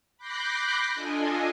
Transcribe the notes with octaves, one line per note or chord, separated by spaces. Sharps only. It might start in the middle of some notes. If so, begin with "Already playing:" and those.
B5 D6 F#6 G6 A#6 C7
D4 F4 A4 D#5 G#5